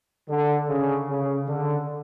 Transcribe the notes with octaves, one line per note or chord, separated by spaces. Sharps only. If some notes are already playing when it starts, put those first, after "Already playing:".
D3
C#3
C#3
D3